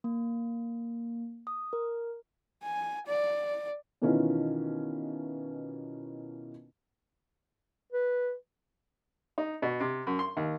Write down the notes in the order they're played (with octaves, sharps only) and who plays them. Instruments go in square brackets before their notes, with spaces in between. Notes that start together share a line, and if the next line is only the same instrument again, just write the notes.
[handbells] A#3
D#6
A#4
[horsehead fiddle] G#5
D5
[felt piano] B2 D#3 E3 C#4 F4
[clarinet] B4
[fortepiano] D#4
B2
C3
F#2
C6
D#2